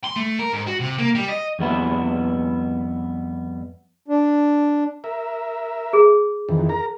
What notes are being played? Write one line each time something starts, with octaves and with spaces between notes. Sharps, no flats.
C6
A3
A#4
G#2
F#4
C3
A#3
G3
D#5
F2 G3 B3 E4
D4
A#4 E5
G#4
F2 D#3 E3
A#4 A#5